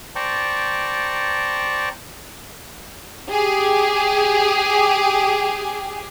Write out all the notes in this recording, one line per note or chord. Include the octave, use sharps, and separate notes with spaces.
C5 D5 G5 A5 A#5 C#6
G4 G#4